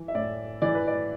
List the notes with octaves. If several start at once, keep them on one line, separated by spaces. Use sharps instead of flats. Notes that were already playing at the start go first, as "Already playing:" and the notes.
Already playing: E3
E5
A2 D5
E3 D5
B4
D5